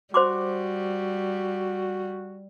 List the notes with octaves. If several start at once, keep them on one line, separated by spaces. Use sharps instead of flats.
G3 F#4 C5 C6 D6